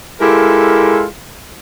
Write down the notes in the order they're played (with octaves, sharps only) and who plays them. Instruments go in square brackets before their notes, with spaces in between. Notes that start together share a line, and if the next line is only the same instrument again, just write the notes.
[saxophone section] G#3 E4 F4 G4 A4 A#4